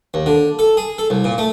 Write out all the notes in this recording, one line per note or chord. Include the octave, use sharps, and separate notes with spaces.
D#2
D3
A4
G#4
A4
C2
A#2
A3